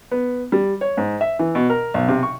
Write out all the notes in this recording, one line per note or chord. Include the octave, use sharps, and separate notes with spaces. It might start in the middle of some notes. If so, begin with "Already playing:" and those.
B3
G3
C#5
G#2
E5
E3
B2
A#4
B1
C3
C#6